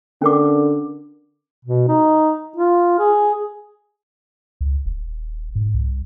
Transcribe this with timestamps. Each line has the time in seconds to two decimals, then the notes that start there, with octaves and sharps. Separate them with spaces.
0.22 D3 C#4 A#4 D6
1.65 B2
1.88 D#4
2.56 F4
2.99 G#4
4.61 C#2
4.86 D#1
5.55 G#2
5.74 C2